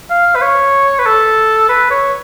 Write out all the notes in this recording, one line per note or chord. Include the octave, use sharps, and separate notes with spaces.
F5
B4
C#5
B4
A4
B4
C#5